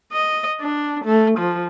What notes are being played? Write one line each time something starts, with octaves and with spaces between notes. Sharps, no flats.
D#5
D4
A3
F3